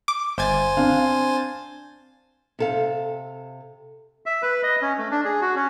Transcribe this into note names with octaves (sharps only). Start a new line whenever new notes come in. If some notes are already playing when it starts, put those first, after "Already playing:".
D6
G1 C5 G#5 G#6 A6
C4 D4 F5
C3 A4 F5
E5
B4
D#5
C#4
A3
D4
G#4
F#4
C#4